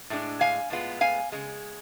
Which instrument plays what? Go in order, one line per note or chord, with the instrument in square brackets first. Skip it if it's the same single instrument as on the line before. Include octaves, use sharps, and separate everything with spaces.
[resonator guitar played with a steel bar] A2 G#3 D4
F5 G#5
A2 G#3 B3 F4
F5 G#5
C#3 G#3